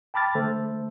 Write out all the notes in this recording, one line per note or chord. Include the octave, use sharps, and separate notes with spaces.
G5 A5 B5 D6 F6 A6
D3 A3 A4 C5